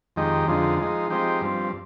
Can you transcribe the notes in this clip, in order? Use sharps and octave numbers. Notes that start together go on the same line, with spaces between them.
F2 D#3 G#3 D#4 G4
F2 D3 F3 G#3 D#4
F3 G#3 D#4
F3 G#3 C4 D#4 G4
G2 F3 C4